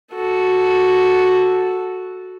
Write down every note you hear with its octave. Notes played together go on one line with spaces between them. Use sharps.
F#4 A4